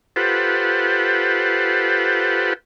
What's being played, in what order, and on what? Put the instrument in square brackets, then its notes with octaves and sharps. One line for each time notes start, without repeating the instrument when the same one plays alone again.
[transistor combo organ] F4 G4 A4 B4 C5 F#5